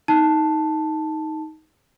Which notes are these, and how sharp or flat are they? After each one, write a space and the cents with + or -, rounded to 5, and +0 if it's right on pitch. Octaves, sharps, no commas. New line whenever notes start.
D#4 +15 A5 +0